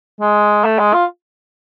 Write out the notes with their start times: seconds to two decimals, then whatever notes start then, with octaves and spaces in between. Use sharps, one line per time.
0.21 G#3
0.64 A3
0.79 G#3
0.93 F4